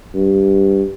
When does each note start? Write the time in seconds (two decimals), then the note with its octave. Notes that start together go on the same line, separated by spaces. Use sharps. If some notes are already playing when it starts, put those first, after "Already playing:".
0.15 G2